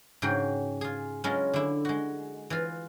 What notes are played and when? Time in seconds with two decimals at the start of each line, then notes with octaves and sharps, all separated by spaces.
0.22 G#2 C#3 F#4 G#4 G5
0.81 F4 G#4
1.24 F#3 G#3 C#4 E4 F4
1.53 D3 E4
1.85 G#3 F#4
2.50 E3 F4